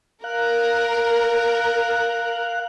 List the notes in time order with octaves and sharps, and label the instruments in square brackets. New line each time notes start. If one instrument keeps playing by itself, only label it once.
[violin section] A#4 [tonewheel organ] F5 F#6